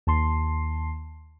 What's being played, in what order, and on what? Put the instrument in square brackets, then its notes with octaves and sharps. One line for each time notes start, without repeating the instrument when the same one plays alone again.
[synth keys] D#2 A5 C6 C7